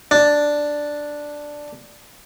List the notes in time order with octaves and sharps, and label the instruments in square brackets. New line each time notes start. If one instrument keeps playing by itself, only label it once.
[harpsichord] D4